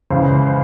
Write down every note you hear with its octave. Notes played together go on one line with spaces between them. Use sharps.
C#2 C#3 E3 C5
C5